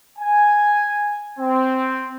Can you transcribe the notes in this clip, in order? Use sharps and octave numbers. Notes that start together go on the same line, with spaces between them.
G#5
C4